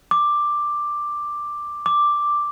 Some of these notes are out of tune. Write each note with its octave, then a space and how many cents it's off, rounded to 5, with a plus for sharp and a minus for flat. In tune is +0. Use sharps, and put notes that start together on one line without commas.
D6 +5
D6 +0